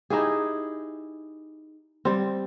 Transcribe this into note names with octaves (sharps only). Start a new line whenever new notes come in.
D#4 E4 G4 G#4
G3 C4